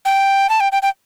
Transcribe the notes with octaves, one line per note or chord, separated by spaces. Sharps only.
G5
A5
G5
G5
G5